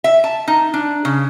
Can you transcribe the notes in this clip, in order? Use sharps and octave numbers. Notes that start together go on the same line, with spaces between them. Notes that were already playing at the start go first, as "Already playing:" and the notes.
E5
A5
D#4
D4
C#3